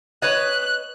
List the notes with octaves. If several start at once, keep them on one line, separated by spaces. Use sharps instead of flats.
B4 C#5 D#5 F#6